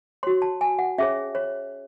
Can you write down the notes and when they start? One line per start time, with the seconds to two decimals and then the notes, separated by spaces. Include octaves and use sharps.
0.23 F#4 C#5 C6
0.42 A5
0.61 G#5
0.79 F#5
0.98 C#4 G#4 C#5 E5
1.35 C#5